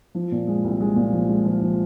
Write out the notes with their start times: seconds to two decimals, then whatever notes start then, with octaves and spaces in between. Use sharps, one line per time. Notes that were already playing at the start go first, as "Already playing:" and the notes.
0.15 F3
0.32 A#2
0.47 G#3
0.64 C2
0.80 G#3
0.96 A#2
1.13 F3
1.29 G#3
1.45 F3
1.62 F3